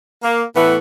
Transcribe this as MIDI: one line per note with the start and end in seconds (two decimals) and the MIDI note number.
0.22 0.43 58
0.55 0.77 45
0.55 0.77 52
0.55 0.77 57
0.55 0.77 59